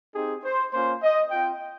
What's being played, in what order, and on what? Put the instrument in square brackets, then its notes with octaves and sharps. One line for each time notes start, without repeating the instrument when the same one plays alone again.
[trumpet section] C4 D#4 G4 G#4
C5
A#3 C#4 F4 C5
D#5
C4 F4 G5